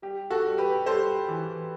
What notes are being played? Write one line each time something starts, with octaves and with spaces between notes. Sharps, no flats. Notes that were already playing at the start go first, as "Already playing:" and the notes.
G3 G4
F#4 A4
G3
G4 B4
G3 A4 C5
E3